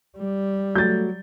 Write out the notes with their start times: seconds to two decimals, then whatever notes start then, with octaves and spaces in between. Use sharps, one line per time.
0.18 G3
0.75 F#3 A3 G6 A6